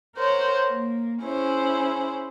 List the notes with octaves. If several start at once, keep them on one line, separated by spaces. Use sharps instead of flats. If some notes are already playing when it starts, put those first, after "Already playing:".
A#4 C5 C#5 F#5
A#3
C#4 E4 G#4 C5